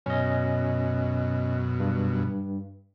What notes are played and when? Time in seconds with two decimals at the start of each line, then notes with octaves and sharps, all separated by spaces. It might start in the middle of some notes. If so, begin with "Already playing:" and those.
0.06 F#2 B2 C#4 D#5
1.80 G2